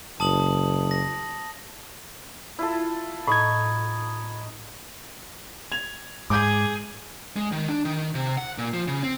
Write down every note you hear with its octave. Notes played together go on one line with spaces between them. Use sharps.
F#1 A5 D#6 F#7
A#6
E4 F4 A4
A2 D#4 D#5 B5 C#6 G#6
G#6 F7
G#2 G#4 D6 G6
G#3
D#3
D4
D#3
C3
F#5
A#2
F3
C#3
C4